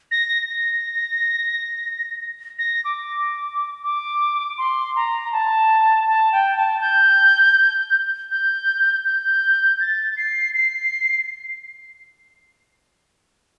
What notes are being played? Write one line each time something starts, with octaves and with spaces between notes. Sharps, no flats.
A#6
A#6
A#6
D6
D6
C6
A#5
A5
A5
G5
A5
G6
G6
G6
A6
C7
C7